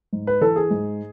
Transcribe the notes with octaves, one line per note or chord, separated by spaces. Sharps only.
G#2
B4
E3 A4
G#4
G#2